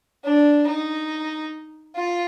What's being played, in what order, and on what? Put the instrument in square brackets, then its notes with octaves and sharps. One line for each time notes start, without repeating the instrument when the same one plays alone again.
[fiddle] D4
D#4
F4